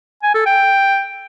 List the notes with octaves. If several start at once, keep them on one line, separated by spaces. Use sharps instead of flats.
G#5
A4
G5